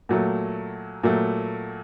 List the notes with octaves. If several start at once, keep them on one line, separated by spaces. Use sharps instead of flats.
A#2 F#3 A3
A#2 F#3 A3